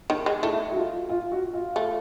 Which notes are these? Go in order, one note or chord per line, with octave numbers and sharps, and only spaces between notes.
D#3 D#4
G#3
A3 E4
F#4
F4
F4
F#4
F4
A3